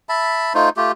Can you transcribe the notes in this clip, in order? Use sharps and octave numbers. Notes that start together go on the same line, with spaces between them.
E5 A5 B5
A3 D#4 F4 C5
A3 F4 G4